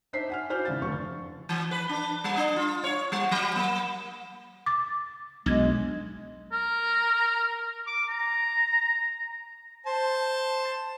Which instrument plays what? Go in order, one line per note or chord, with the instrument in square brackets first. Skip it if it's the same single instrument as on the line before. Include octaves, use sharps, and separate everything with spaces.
[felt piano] D4 D#4 C5 E5 B6 C7
F#5 G#5 F6
E4 F#4 C5 D5 F6 G6
G#1 C#3 F5 A6
F1 D3 C#6
[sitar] E3
B4
D4
G3
D4
F4
C#5
G3
F#3
A#3
[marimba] D6 A6
[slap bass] B1 [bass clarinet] G#3 [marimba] D4 G#6
[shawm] A#4
D6
A#5
[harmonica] C5 A5